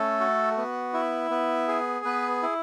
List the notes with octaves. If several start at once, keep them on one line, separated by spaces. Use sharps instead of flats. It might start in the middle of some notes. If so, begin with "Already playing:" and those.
Already playing: A3 C#4 A4
F#4
B3
E4
B3
G#4
B3 B4
E4